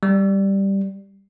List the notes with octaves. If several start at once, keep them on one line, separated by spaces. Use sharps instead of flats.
G3